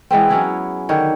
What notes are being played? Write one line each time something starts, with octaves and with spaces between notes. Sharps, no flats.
E3 G#3 B3 C4
F#3 C#4 E4 G#4
D3 D#3 C#5